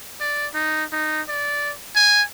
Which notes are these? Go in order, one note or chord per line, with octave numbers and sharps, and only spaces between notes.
D5
D#4
D#4
D5
G#5